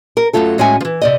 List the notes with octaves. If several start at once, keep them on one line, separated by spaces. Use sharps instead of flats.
A#4
F#2 A#2 F#3 A3 F4 A4
A2 G#3 C#4 F#4 E5 G#5
E3 F3
C3 D5 D#5